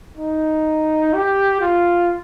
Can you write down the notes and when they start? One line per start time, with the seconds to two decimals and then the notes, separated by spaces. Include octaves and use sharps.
0.17 D#4
1.13 G4
1.61 F4